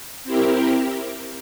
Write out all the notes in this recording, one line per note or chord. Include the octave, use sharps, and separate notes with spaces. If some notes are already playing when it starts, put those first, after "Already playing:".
C4 E4 G4 A#4